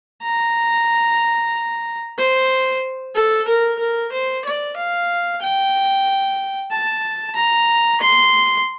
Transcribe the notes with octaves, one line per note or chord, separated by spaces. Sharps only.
A#5
C5
A4
A#4
A#4
C5
D5
F5
G5
A5
A#5
C6